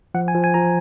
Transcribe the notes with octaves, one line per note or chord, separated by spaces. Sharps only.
F3 F#5
G#5
F3
G#5
F3 A#5